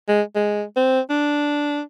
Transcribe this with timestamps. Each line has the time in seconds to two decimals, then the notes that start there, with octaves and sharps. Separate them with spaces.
0.08 G#3
0.35 G#3
0.76 C4
1.10 D4